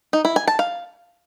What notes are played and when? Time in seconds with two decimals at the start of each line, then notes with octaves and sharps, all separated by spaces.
0.13 D#4
0.25 E4
0.36 G#5
0.48 A5
0.59 F5